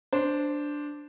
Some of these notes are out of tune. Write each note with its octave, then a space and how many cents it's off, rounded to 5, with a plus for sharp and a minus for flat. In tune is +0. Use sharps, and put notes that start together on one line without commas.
D4 +0 C5 +0